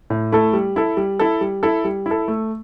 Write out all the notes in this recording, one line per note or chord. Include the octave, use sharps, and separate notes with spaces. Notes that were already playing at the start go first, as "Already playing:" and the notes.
A2
A3 E4 A4
G3
E4 A4
G3
E4 A4
G3
E4 A4
G3
E4
A4
A3